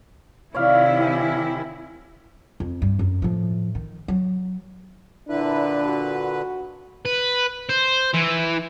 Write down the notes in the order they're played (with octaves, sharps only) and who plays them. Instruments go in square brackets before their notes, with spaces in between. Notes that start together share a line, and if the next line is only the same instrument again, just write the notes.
[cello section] C3 D#3 E4 [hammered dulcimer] C#5 D5 F5
[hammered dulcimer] G4 G#5
[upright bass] F2
G2
F#2
A2 F3
D#3
F#3
[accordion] A#2 D3 B4 [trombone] D4 [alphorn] E4
[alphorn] F#4
[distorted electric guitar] B4
C5
E3